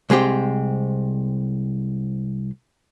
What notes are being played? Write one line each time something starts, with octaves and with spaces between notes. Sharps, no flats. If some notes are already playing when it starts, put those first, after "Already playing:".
C2 G#3 C4 G4